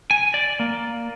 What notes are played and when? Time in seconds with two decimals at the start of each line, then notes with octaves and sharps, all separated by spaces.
0.11 G#5
0.34 D5
0.60 A#3